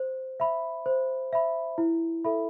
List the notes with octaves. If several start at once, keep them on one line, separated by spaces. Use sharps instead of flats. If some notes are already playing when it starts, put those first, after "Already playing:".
Already playing: C5
E5 B5
C5
E5 B5
E4
A4 E5 B5